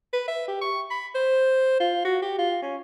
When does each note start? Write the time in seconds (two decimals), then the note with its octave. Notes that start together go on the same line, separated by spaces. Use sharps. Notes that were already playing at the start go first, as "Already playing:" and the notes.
0.13 B4
0.28 E5
0.48 G4
0.62 C#6
0.90 B5
1.15 C5
1.80 F4
2.05 F#4
2.22 G4
2.38 F4
2.62 C#4